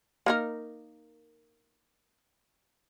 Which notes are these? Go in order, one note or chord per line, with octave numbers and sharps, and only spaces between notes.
A#3 D#4 A#4